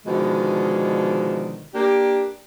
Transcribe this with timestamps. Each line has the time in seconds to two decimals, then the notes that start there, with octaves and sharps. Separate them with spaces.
0.06 B2 D3 D#3 F3 G#3
1.73 A#3 D4 G4